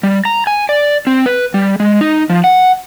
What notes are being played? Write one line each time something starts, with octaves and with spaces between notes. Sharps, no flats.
G3
A#5
G#5
D5
C4
B4
G3
G#3
D#4
F3
F#5